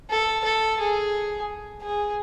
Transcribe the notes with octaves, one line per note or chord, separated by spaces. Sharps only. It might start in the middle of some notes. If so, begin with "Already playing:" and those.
A4
A4
G#4
G#4